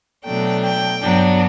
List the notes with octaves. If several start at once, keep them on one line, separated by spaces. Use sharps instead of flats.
B2 F#3 A3 D4 G5
G5
G2 F#3 B3 D4